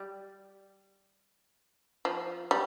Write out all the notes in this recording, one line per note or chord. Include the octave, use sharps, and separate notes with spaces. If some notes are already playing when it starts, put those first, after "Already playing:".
Already playing: G3
F3
G3